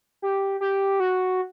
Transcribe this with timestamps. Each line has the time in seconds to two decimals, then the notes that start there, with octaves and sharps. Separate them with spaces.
0.22 G4
0.61 G4
1.00 F#4